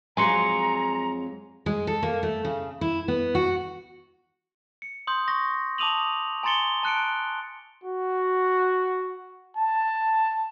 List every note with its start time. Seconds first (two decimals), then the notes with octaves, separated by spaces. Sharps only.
0.17 F2 F#3 G#3 G#5 A#5 C6 C#7
1.66 G#3
1.87 A4
2.03 A#3
2.23 A3
2.45 C#3
2.81 E4
3.08 B3
3.35 F#4
4.82 C#7
5.07 C6 D#6 G6
5.28 C#6 A#6
5.78 A5 D6 D#6 D#7 F7 F#7
6.43 G#5 A#5 C6 A6 C#7 G7
6.83 A5 F#6 C#7 D7
7.84 F#4
9.57 A5